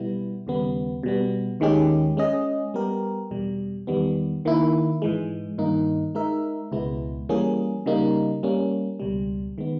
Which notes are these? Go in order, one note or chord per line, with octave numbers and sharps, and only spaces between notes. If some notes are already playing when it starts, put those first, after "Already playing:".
Already playing: B2 G3 B3 E4
D#2 C#3 G3 B3
B2 G3 B3
D#2 D#3 G#3 C#4 G4
G#3 C#4 G#4 D#5
G3 B3 G4 A#4
E2 B2 G3
E2 D#3 G3 B3
D#3 A#3 E4
G#2 E3 G#3
G2 D#3 A#3 D#4
G#3 D#4 A#4 E5
C#2 B2 G#3 B3 E4
E3 G3 A#3 C#4 G#4
C#3 G3 A#3 D#4
G3 A#3 C#4
C#2 B2 G3
D#3 G#3 B3